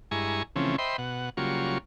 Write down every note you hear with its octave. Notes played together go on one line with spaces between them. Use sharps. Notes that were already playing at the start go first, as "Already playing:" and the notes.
G2 G#3 E4 G#5 A#5 C#6
C#3 E3 F3 A3 C4 C#4
C5 D#5 E5 G5 B5 C6
B2 F#5
C#3 F#3 G3 A#3 F4 C#6